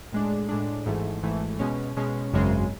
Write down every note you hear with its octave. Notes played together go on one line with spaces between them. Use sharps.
A2 G#3 D4
A2 G#3 D4
G#1 G#2 E3 A3
G#1 G#2 E3 A3
B2 G#3 C#4
B2 G#3 C#4
G#1 F#2 C#3 G#3